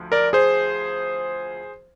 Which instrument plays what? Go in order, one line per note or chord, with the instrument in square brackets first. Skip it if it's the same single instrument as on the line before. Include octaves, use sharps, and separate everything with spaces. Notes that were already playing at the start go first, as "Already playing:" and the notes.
Already playing: [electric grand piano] D2 F3
A#4 D5
G#4 C5